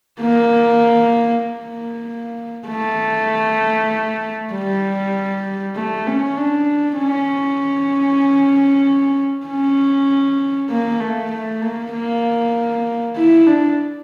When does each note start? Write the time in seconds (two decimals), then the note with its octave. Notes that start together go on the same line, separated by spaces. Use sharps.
0.20 A#3
1.44 A#3
2.67 A3
4.52 G3
5.76 A3
6.07 C#4
6.37 D4
6.98 C#4
9.46 C#4
10.69 A#3
11.00 A3
11.31 A3
11.62 A#3
11.93 A#3
13.16 E4
13.47 D4